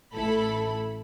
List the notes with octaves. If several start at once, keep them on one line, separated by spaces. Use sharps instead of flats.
A1 A3 E4 A4 B5